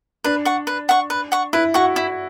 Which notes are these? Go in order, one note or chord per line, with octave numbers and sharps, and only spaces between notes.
D4 B4
F#5 C#6
B4
F#5 C#6
B4
F#5 C#6
E4 B4
F#4 F#5 C#6
E4